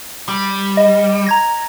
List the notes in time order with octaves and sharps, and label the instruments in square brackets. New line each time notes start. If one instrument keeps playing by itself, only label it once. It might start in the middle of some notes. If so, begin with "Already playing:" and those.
[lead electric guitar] G3
[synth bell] D#5
A#5 G#6 A#6